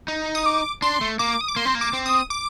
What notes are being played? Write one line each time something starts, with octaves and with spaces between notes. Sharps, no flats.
D#4
D#6
D6
D4 C6
A3
A#3 D6
D#6
D6
A#3 C6
C4
A#3
D6
C4
D#6
D6